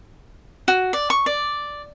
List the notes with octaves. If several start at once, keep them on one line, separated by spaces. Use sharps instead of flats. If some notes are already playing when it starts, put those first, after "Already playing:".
F#4
D5
C#6
D5